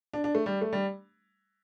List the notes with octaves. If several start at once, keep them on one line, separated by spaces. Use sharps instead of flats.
D4
D4
A3
G3
A3
G3